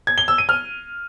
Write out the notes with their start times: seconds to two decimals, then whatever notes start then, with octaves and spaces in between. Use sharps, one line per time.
0.07 G#6
0.18 G7
0.28 E6
0.38 D#7
0.49 F6